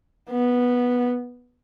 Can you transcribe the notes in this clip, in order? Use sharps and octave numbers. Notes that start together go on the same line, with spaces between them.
B3